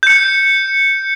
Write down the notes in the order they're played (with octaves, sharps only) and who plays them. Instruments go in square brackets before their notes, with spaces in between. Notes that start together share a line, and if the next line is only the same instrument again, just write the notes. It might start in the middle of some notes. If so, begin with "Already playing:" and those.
[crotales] G6 C#7